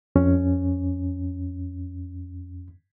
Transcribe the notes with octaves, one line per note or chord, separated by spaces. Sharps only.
F2 C#4